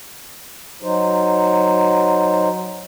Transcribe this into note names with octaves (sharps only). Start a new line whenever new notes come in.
F#3 D#4 C5